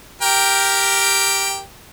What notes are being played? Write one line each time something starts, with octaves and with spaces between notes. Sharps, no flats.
G4 A#4 G5